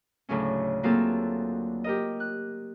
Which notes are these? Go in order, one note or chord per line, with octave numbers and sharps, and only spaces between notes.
D2 A2 C#3 F#3 C#4
F#3 A#3 C4 F4 G#4 A4
G4 A#4 D#5
F#6